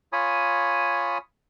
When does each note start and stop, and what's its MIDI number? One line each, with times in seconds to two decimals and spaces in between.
0.13 1.18 65
0.13 1.18 73
0.13 1.18 80
0.13 1.18 83
0.13 1.18 87